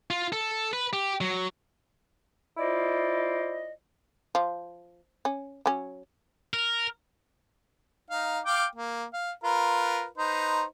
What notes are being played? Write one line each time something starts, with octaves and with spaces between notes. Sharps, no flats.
F4
A4
B4
G4
F#3
E4 F4 C5 D5 D#5
F3
C#4
F#3 C#4
A#4
D#4 F5
F5 G5 D6
A#3
F5
F4 A#4 B4
D#4 B4 C5